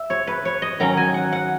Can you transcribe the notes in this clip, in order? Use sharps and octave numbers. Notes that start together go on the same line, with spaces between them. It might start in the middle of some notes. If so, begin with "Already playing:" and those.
Already playing: E5
C#5
B4
C#5
D#5
D#3 F#3 C#4 A#5
G#5
F#5
F#5